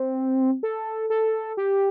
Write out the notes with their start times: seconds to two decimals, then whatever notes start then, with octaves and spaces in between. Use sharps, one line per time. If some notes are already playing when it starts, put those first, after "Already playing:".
Already playing: C4
0.63 A4
1.10 A4
1.57 G4